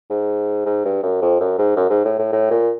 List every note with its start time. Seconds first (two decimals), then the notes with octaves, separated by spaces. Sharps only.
0.10 G#2
0.66 G#2
0.85 G2
1.03 F#2
1.22 F2
1.40 F#2
1.58 G#2
1.76 F#2
1.90 G#2
2.05 A2
2.19 A2
2.33 A2
2.51 A#2